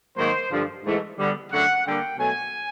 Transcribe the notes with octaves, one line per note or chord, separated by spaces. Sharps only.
G#2 D#3 F#3 A#3 C5
G2 D3 F3
G#2 E3 A3
D3 G3 B3
F#2 D3 F#3 A3 F#5
D3 G3 A#3 G5
B2 F#3 A3 G#5